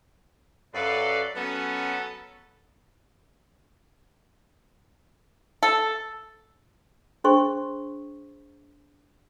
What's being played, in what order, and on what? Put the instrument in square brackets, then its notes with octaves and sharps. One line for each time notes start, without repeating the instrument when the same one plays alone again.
[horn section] F#2 B4 [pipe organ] A4 D5 F5
[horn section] F#3 B3 A4 [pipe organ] C#4
[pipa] A4
[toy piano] D4 G#4 C5 C6 C#6